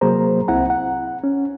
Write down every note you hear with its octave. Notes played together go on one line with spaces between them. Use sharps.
C3 F#3 A#3 G#4 C5 A#5
C2 C4 E4 F#5 A#5
F#5
C#4